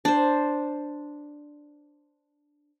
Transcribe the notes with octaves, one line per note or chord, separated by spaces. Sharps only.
D4 C5